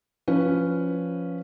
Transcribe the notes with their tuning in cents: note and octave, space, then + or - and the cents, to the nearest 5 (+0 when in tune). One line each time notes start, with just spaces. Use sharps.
F3 +5 C#4 +0 B4 +0